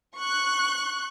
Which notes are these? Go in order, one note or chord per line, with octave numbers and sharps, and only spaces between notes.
C#6 F#6